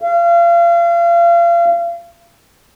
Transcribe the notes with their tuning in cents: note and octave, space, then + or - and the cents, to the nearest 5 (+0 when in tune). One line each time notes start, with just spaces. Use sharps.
F5 -35